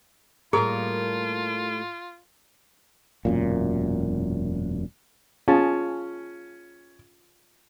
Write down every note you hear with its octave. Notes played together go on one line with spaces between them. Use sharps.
A2 G3 A#3 F4 G#4 A#4 D#6
E1 F#2 A#2
C#4 F4 G#4 A5